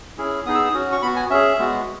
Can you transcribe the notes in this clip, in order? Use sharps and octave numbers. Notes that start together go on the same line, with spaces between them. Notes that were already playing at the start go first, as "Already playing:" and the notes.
C#4 E4 G#4
B3 D#4 G#4 D#6
E6
D#6
C#4 F#4
C#6
B3 F#4 B5
G#5
C#4 G#4 E5
G#3 B3 F#4